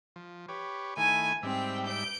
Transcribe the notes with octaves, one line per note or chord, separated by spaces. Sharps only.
F3
G4 B4 C#5
D#3 A3 E4 G#5
G#2 G3 C4 E5 G5
G6 D7